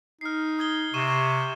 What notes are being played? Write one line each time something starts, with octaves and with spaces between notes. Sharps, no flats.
D#4 F6 C7
D#6 G#6 G7
C3 C#6 D#7 E7
C#6 G#6 D#7